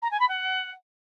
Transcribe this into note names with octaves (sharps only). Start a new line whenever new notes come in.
A#5
G#5
B5
F#5